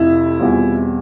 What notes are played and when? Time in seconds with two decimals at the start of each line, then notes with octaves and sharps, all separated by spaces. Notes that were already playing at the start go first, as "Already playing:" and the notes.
Already playing: F1 F2 C3 E4
0.39 E2 B2 G3 C4 F4